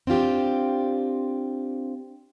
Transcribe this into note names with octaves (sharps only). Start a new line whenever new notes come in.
C4 D4 F4 G4